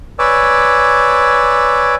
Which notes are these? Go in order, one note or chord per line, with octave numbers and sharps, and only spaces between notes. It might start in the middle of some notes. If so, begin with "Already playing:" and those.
B4 C#5 D5 G#5 D6 E6